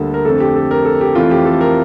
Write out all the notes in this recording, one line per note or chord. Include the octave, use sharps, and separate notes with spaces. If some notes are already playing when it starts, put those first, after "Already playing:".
Already playing: D2 D3 G3 A#3 A4
A#4
F2 D3 A3 A4
G4
A4
A#4
A4
G4
F2 E3 A3 F4
G4
A4
A#4